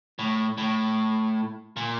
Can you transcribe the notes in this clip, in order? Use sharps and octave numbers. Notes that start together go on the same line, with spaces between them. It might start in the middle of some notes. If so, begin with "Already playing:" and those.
A2
A2
A#2